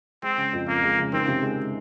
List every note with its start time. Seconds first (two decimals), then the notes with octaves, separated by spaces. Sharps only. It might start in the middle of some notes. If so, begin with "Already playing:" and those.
0.23 G#3 C4
0.38 C#3
0.53 F2
0.68 F2 A#3
0.83 G#3
0.98 C#3
1.13 D#3 C4
1.28 C3
1.43 G#3